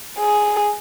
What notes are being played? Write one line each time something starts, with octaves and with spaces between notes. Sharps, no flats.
G#4